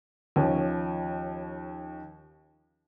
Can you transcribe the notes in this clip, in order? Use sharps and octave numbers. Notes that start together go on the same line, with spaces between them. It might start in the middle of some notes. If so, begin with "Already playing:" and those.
D#2 F3 C#4